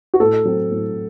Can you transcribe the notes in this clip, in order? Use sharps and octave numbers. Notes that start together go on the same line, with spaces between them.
F#4
A2 A4
F#3 C4
A2